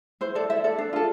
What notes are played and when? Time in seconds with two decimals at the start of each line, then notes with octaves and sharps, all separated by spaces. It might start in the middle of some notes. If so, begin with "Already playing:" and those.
0.21 E4 C5
0.35 A4 D5
0.50 E4 E5
0.64 A4 D5
0.79 D4
0.93 F4 A4